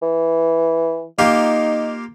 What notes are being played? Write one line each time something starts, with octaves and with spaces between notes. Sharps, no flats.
E3
A#3 D#4 F4 G4